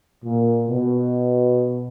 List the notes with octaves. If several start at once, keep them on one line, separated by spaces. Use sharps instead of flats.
A#2
B2